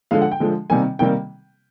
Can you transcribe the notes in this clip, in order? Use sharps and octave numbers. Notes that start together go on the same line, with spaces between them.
D3 F3 G#3 F5
F#5
G5
D3 F3 G#3
C3 D#3 G3 A#3 G#5
C3 D#3 G3 A#3 G5